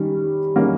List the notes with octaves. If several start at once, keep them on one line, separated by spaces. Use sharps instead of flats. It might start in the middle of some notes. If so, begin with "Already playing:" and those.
Already playing: D#3 G3 C#4
D#3 G3 A#3 C#4